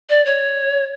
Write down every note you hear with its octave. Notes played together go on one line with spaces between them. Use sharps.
D5
C#5